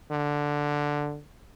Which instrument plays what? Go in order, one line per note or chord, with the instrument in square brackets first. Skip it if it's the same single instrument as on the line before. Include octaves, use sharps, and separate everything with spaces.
[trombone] D3